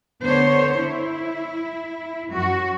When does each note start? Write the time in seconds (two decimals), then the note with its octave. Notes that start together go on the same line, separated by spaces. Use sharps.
0.22 D3 B3 C5 C#5
0.78 E4
2.31 F#2 F#4